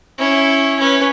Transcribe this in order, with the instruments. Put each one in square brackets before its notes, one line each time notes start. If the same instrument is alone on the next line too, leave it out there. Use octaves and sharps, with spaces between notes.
[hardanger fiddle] C#4 E4
C#4 B4